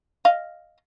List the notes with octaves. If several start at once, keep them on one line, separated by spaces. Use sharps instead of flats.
D#5 F5